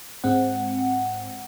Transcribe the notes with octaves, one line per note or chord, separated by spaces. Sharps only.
G#2 G#3 C4 F#5